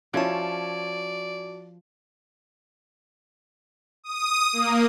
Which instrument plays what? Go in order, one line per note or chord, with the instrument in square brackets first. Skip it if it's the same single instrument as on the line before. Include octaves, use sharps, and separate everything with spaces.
[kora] F3 [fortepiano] C#4 E4 [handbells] F#4 A5 [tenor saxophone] D5
[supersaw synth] D#6
A#3